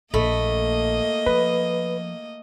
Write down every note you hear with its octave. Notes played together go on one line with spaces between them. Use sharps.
A#1 A3 A#3 D#5 B5
F3 B4